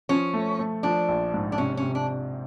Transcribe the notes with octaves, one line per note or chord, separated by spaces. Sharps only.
F3 C#4
A3
A3
F3 D4
A#1
G#2
D4
C3 C#4
C#4
C3
D4